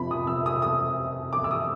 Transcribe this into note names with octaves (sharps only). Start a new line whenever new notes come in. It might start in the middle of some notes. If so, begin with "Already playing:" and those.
Already playing: F1 F2 C3 F3 B5
D#6
E6
D#6
D#6
D6
E6
D#6